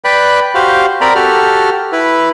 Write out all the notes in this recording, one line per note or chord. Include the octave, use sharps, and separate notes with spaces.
B4 D5 G5 B5 F#6
F#4 G4 C5 F5
C4 A#4 D5 A#5 B5
F#4 G4 A4 F6
E4 B4